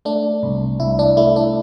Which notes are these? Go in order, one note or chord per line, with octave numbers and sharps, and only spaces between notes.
A3 D4
C2
C2 E4
D4
A3 E4
D4